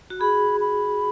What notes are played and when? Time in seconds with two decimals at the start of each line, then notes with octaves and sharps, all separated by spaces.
0.10 F#4
0.20 G#4 B5
0.60 B5